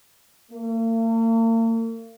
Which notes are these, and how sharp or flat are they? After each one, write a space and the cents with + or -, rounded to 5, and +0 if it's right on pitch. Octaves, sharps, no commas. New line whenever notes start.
A#3 -45